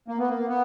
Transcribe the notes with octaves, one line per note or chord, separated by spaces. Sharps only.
A#3
B3
A#3
B3